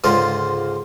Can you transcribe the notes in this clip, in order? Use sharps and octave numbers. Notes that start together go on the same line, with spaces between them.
C#2 G#2 D3 F3 F4